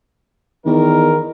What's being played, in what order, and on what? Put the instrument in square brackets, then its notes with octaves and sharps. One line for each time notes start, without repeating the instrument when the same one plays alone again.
[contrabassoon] E2 [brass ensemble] D#3 A#4